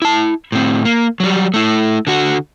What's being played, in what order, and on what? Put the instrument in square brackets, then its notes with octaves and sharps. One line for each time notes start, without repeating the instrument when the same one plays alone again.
[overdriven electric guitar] E4 A5
A2 C4
A#3
F#3 G3
A3 E4
D3 F#4